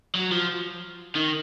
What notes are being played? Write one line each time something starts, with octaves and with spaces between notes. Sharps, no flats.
F#3
F3
D#3